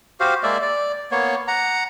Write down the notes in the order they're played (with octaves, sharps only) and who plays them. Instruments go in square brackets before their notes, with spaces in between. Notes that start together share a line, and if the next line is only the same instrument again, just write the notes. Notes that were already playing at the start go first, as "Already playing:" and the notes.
[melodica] F#4 G4 C5 F5
G#3 A#3 D5 E5
D5
A#3 B3 C#5
F#5 A#5